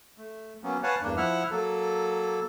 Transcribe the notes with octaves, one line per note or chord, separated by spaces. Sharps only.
A3
F#3 A#3 B3 C#4
B4 C#5 F5 F#5 G#5 A5
E2 G2 A#3 D4
F3 E4 E5 F#5 F6
F#3 A#3 A4